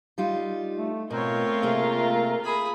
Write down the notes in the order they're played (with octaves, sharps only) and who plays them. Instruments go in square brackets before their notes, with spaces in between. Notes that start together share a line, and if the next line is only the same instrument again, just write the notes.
[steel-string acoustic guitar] G3 D#4 F4
[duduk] A3
[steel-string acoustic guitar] B2 [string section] A3 F4 [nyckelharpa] C4 C#5 [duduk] A#4
[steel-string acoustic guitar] C3 A#3 G#4
[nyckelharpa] G#4 B5